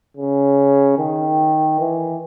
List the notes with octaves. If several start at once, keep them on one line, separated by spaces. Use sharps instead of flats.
C#3
D#3
E3